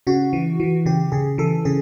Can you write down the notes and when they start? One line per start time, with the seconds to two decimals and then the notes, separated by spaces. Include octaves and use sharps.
0.07 C#3 F#4
0.33 E3
0.60 E3
0.86 C#3 G4
1.12 C#3 G#4
1.38 E3 A4
1.65 C#3 G#4